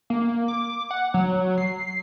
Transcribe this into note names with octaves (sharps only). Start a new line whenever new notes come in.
A#3
D6
F#5
F#3
C7